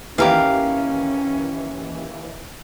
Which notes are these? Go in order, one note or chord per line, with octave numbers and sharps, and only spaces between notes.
D#2 E3 C#4 G4 A#4 F5